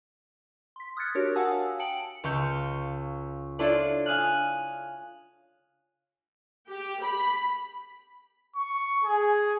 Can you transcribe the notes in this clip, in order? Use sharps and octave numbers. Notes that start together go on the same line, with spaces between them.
C6 B6
D#6 F6 F#6 G#6 A6 C#7
D4 F#4 G4 A#4 C#5
F5 F#5 G#5 A5 D#6 E6
G5 A5 C#7 D7 F#7
C#2 F5 C#6 G6
D4 E4 F4 A4 C#5 D5
F5 G#5 D#6 F6 F#6
G4
B5
C#6
G#4